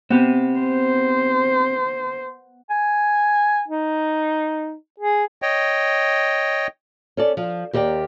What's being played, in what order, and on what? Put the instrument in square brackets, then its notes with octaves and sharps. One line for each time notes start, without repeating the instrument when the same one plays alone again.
[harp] B3 [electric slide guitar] C4 G4
[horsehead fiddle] C5
[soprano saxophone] G#5
D#4
G#4
[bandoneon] C#5 D#5 G5
[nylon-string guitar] C#4 A4 D5
F3
D#2 G4 A#4 D5 G5